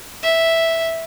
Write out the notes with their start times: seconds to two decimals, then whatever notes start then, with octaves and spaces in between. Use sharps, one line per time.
0.23 E5